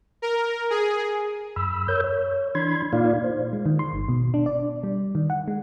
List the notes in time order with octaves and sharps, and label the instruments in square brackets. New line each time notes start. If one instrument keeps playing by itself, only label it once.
[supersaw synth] A#4
G#4
[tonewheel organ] F#2 B5 E6
A#4 C#5 E6 G6
C#5
E3 D4 B5 C6 G#6
A#2 A#3 D#4 F4 D5 F5
C5
[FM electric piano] G#3
D#3
C6
G1
B2
D4
D5
G3
D#3
F#5
G#3